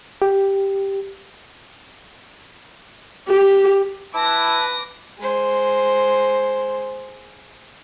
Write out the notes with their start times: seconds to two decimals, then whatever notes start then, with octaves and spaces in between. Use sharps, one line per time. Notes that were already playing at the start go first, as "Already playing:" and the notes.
0.22 G4
3.28 G4
4.14 E4 B4 A5 D6 A#6
5.20 G#3 C5